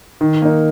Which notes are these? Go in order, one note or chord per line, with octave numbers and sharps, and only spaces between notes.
D#3
A#3 D#4